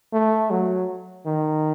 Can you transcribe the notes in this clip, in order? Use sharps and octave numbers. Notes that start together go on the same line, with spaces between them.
A3
F#3
D#3